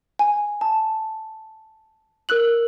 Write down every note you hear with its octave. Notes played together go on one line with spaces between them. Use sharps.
G#5
A5
A#4 E6 F#6 F#7